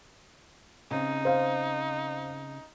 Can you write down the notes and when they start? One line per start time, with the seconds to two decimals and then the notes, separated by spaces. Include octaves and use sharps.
0.91 C#3 C4 D#4
1.25 C5 F5